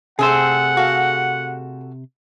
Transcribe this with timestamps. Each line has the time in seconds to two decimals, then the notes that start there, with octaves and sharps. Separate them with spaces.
0.19 C3 A3 C4 G#4 C5 F#5
0.77 F#4 A4 F5